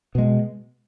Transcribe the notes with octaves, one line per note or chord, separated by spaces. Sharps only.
B2 G#3